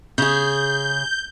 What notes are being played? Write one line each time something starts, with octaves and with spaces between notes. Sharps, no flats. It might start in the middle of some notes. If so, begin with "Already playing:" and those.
C#3 G#4 G6